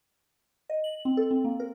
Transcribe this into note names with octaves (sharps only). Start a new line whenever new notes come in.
D#5
F#7
C4
A4
C4
A#3
A#4